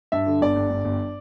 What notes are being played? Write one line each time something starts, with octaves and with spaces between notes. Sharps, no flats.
G2 E5
D3
G1 D5
G2
G2
G1